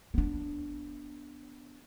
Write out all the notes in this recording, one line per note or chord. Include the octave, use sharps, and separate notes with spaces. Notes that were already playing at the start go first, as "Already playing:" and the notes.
B3 D4